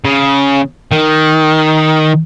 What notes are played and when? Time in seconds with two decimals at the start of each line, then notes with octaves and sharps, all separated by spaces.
0.05 C#3
0.92 D#3